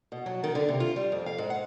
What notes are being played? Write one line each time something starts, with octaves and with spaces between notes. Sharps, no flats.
B2
F#3
D#3
D3
C3
F4
G3
F2
F5
G#2
F#5